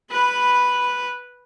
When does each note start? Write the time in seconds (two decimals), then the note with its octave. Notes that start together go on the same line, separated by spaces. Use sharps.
0.11 B4 B5